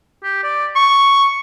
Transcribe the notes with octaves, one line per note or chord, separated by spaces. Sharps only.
G4
D5
C#6